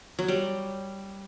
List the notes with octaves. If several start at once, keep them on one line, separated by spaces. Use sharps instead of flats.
F#3
G3